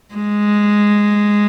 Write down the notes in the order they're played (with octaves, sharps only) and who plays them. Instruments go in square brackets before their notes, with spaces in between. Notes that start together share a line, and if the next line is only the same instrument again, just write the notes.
[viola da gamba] G#3